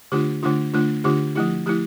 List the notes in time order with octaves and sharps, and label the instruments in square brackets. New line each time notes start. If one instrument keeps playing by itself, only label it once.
[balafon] D3 A3 D4 F4 G4
D3 A3 D4 F4
D3 A3 D4 F4
D3 A3 D4 F4 G4
F3 A3 E4 G4
F3 A3 E4 G4